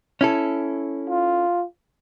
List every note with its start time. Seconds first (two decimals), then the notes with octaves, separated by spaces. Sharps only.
0.21 C#4 E4 A4
1.09 F4